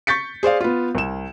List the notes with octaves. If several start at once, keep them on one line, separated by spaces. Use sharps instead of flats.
C#6 G6 A6 B6 C#7
G#4 C5 D5 F5
B3 F4
C2 E7